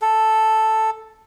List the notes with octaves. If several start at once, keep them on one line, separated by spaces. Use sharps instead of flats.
A4